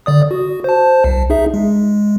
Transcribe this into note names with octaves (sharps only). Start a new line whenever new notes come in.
D3 D5 D#6
F#4
C5 A5
C2
D#4 G#4 E5
G#3